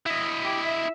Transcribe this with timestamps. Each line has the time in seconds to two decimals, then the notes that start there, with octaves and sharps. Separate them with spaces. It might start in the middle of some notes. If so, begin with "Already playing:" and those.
0.06 E4 D#5
0.45 G4
0.65 E5